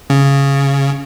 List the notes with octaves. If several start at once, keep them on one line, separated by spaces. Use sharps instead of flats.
C#3